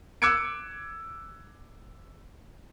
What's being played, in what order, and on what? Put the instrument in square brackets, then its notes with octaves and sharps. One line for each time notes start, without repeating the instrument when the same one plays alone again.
[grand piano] D6 E6 F#6 G#6 C#7 D7